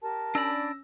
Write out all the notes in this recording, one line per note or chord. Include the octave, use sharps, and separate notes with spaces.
G4 A#4 A5
C#4 D4 D5 B5 E6 A#6